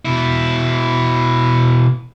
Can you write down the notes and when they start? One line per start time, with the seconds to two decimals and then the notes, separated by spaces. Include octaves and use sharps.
0.05 B2 E4